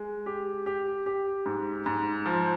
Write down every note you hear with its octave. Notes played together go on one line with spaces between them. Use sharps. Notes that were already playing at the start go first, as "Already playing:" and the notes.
Already playing: G#3
G4
G4
G4
G#2
G#2
F3